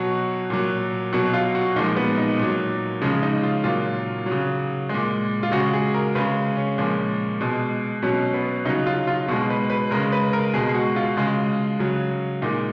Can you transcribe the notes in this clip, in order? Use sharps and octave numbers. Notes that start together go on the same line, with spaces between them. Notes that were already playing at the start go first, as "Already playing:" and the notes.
Already playing: B2 F#3 F#4
A#2 F#3
B2 F#3 F#4
F4
F#4
A#2 F3 G#3 D#4
B3
D#4
A#2 F#3
C#3 F3 G#3 C#4
D#4
F4
A#2 F#3 F4
F#3
C#3
A#2 G#3
F4
C#3 G#3 F#4
G#4
A#4
C#3 G#3 B4
C#4
A#2 F3 G#3
B2 G#3
B2 F#3 C#4
B3
C#3 F#3 D#4
F4
F4
B2 G#3 F#4
B4
B4
C#3 G#3 A#4
B4
A#4
B2 G#3 G#4
F#4
F4
C#3 G#3
C#3 F#3
A#2 G#3 D#4